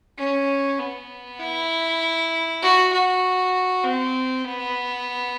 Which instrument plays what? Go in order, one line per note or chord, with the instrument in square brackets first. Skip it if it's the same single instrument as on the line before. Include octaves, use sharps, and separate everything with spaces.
[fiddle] C#4
B3
E4
F#4
F#4
C4
B3